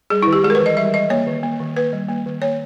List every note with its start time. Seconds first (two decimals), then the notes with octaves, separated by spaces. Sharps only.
0.10 G3 G#4
0.23 E4
0.27 D#3
0.33 G4
0.44 G#3 G#4
0.50 A#4
0.55 B4
0.61 E3
0.66 D#5
0.77 G3 E5
0.94 E3 D#5
1.10 A#3 C#5
1.27 D#3
1.43 A#3
1.60 D#3
1.76 A#3 B4
1.93 G3
2.09 A#3
2.26 D#3
2.42 A#3 C#5